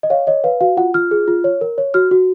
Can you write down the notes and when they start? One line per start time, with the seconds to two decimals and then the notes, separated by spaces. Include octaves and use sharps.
0.03 D#5
0.10 C#5 F5
0.27 C#5 D#5
0.44 B4 F5
0.61 F#4 F5
0.77 F4 F#5
0.94 F4 F6
1.11 G#4
1.28 F4
1.44 C#5
1.61 A#4
1.78 C#5
1.94 F#4 F6
2.11 F#4